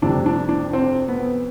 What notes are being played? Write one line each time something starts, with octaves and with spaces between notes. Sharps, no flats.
F1 F2 C3 G3 D4
D4
D4
C4
B3